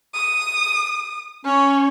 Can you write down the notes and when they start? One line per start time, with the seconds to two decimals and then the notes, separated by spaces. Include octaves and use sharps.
0.14 D#6
1.45 C#4 C#5